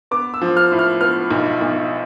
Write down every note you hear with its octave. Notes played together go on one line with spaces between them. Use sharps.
B3 D6
E6
F3
F6
A2
F6
B3 F6
B1
B1